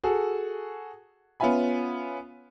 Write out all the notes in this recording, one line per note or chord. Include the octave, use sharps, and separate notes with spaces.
F#4 G#4 A4
B3 C#4 F4 E5 G#5 B5